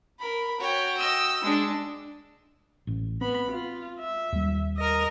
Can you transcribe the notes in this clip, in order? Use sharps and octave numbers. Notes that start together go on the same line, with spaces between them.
A#4 B5
F#4 C#5 G5
D#5 E6
G#3 D4
A1
B3 C4 B5
F4
E5
D#2 G3
A#4 D#5